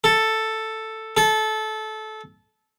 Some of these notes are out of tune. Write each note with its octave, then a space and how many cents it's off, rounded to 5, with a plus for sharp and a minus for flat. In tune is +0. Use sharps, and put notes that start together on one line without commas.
A4 +5
A4 -20